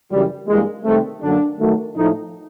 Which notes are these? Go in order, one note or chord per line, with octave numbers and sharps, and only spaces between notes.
F#2 C#3 E3 G3
G2 E3 G3 G#3 A#3
C3 D#3 G3 A3 C4
F#2 D3 F#3 A#3 D4
D#3 F#3 A3
A2 F3 A3 D#4